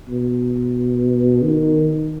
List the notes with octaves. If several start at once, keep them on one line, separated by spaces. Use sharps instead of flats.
B2
D#3